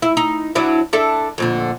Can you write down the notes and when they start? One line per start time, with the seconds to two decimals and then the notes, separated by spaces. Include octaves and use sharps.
0.02 E4
0.17 D#4
0.55 F#3 D4 E4
0.93 D4 E4 A4
1.38 F2 A#2 D3